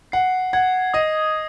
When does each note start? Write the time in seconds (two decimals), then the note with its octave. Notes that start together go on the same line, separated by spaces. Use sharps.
0.12 F#5 C7
0.53 F#5 G#6
0.94 D#5 D#6